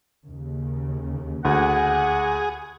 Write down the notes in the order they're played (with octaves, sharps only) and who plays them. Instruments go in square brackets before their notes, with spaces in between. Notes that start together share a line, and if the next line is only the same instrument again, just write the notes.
[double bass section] D#2 C#3
[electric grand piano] D2 [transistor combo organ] G#4 [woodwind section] F#5